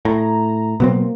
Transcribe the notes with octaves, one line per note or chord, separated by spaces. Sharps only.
A2 A#5
B2 F#3 A#3 C4